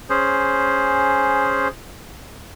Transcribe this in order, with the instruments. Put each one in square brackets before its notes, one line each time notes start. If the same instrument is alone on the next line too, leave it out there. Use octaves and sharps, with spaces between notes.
[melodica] C#4 G#4 C5